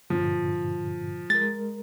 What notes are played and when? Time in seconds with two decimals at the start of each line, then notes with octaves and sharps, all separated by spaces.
0.10 G2 A#2 D3 F3
1.30 G#3 A#4 A6